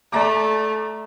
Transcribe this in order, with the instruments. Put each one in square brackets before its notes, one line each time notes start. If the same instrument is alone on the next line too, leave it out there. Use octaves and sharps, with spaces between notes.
[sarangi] A3 [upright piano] D5 A#5 D6